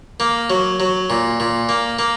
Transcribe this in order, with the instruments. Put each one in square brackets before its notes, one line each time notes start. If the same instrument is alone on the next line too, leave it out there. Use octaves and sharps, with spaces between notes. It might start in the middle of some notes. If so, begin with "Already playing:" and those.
[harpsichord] A#3
F#3
F#3
A#2
A#2
A#3
A#3